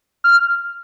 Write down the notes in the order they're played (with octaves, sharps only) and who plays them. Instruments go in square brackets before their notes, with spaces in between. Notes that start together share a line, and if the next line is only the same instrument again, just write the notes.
[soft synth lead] F6